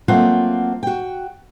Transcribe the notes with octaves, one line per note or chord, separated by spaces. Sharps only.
F#3 A3 A#3 C4 F4 F#5
F#4 G5